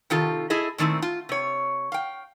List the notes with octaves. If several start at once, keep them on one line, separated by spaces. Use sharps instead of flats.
C3 D#3 F4 A4
E4 G#4 A4 D#5
A#2 D#3 A3 C4 E4
F4
C3 C#5
F5 G5